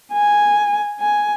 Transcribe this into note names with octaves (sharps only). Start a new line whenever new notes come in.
G#5
G#5